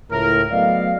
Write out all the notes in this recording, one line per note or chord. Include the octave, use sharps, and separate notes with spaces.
C#2 A2 A#4
F#3 A3 B3 D5 D#5 F5